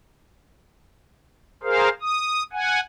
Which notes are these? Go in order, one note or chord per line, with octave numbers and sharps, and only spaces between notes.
G#4 A#4 C5 F5
D#6
F#5 G#5